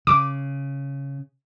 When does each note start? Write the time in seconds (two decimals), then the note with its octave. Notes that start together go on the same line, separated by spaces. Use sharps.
0.07 C#3 D6